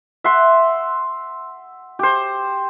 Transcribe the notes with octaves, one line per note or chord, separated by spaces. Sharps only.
E5 F#5 C6
G4 C5